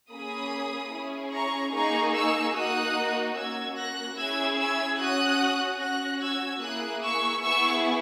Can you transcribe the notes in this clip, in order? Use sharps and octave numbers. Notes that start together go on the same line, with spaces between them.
A#3 C#4 G#4 B5 D#6
C#4 E4 G#4
A#5 C#6
A#3 D#4 G#4 A#5 C#6
C#6 E6
A#3 D#4 F#4 D#6 F#6
A#3 C#4 F#4 E6 G#6
F#6 A#6
C#4 E4 G#4 E6 G#6
E6 G#6
C#4 F#4 D#6 F#6
C#4 F#4 F#6 A#6
E6 G#6
A#3 E4 G#4 D#6 F#6
C#6 E6
B3 E4 G#4 C#6 E6